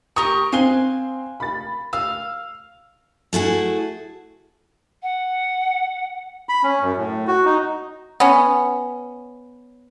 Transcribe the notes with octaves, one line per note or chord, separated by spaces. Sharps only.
G4 A#4 C#6 D#6
C4 F5 G#5 F#6 G7
B5 A6
F5 E6
A3 E4 F#4 G#4
F#5
B5
C#4
F#2
A2
F#4
D#4
B3 C#4